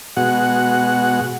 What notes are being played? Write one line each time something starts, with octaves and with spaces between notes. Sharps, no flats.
B2 G#3 F#4 F#5